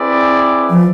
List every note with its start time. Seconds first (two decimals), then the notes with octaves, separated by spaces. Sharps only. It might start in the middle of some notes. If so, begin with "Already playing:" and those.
Already playing: C4 E4 G#4 B4 D5
0.70 F3